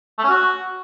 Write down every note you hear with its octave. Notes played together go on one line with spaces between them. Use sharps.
A3
C#4
F#4